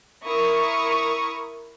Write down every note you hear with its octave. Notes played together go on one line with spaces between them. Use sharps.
E4 A#4 C#6 D#6